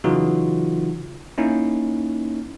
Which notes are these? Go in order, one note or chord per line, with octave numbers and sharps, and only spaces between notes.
C#3 E3 F#3 D#4 F4 F#4
A#3 C#4 D#4 E4